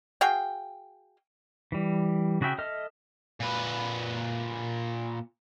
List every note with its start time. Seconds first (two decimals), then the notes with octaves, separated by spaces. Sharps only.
0.21 F#4 G#4 F5 G5
1.72 E3 G3
2.41 C#3 F#4 G#4 E5 G5
2.58 A4 D#5 E5 F6
3.40 A#2 B4